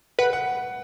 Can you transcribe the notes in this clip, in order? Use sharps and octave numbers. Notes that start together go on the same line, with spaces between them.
B4 F#5
F#5